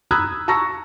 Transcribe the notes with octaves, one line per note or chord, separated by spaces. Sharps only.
A#5 B5 D#6 E6 F#6 G#6
A5 A#5 C#6 E6 A#6